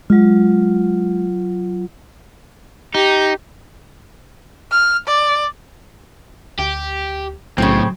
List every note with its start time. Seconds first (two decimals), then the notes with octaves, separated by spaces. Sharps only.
0.10 F#3 G#3 F4
2.95 D#4 G4
4.71 F6
5.07 D5
6.59 D2 G4
7.58 B1 A2 C#3 F#3 C4